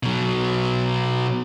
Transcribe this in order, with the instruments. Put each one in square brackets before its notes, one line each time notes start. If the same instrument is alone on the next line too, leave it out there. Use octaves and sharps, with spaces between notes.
[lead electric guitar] B2 F#3